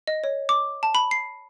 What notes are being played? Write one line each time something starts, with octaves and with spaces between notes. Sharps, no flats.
D#5
C#5
D6
A5
B5
C7